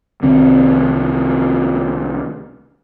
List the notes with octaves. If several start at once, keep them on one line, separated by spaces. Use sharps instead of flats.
C2 D#3 C4